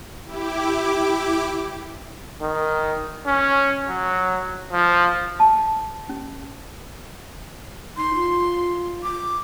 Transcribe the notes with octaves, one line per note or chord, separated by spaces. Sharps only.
E4 G4 D6
D#3
C#4
F#3
F3
A5
C#4
D#4 C6
F4
D6